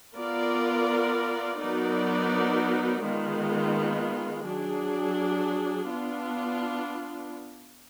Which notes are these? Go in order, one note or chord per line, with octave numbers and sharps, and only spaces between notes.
B3 F4 A#4 D5
F#3 B3 D#4 A#4 D5
D#3 G#3 B3 F4
F#3 D4 G#4
B3 D4 F4